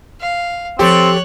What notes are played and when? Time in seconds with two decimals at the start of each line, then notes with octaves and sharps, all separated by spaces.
0.21 F5
0.79 F3 C4 G4 A4 C#5 F#6